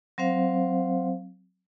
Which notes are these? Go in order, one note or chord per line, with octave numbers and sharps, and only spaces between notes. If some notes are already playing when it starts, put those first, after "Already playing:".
F#3 C4 C5 F5